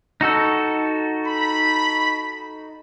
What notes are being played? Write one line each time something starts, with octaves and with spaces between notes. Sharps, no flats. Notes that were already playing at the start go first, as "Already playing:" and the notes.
D#4 F#4 A4
B5